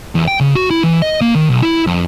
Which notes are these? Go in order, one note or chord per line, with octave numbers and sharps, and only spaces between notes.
E2
G5
C#3
F#4
E4
E3
D#5
A#3
D#3
B1
E4
F2